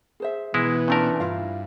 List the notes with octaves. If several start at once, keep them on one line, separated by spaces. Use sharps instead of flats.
G#4 C5 E5
B2 E3 G#3 B3 E4
A#2 A3 C#4 D4 A#4 A5
G2 E4 F4 F5